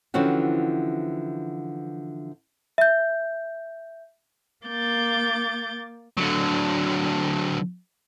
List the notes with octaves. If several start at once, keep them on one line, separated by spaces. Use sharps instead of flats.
D3 E3 F3 C4 C#4 F#4
E5 G6
A#3 D6 G6 A6
D3 F#3